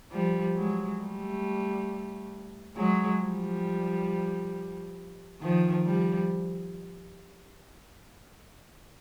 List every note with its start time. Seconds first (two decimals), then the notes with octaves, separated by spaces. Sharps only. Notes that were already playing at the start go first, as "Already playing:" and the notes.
0.12 F3 G3
0.56 F#3 G#3
1.00 G3 A3
2.76 F#3 G#3
3.21 F3 G3
5.41 D#3 F3
5.85 F3 G3